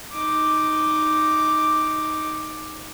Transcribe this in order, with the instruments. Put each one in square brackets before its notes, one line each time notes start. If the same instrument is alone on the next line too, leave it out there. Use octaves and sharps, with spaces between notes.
[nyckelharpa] D#4 D6